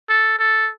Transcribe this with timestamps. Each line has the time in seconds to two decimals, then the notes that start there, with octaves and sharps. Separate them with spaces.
0.09 A4
0.39 A4